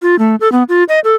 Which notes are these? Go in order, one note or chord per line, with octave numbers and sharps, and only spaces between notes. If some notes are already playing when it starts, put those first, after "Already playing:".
F4
A3
A4
B3
F4
D#5
A4